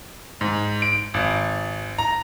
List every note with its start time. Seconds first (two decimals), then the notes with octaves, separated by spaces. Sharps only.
0.41 G#2
0.82 D7
1.14 G#1
1.98 A#5